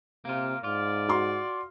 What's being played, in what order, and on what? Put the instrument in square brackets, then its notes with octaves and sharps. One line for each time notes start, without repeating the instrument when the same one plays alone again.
[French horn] C3 [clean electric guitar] A#3 F4
[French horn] G#2 [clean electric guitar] F4 [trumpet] D5
[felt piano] F#4 C6